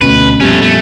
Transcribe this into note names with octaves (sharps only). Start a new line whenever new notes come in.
D2 B2 A3 C#4 B4
F2 A#2 G3 A3 B3 C#4 G4
A3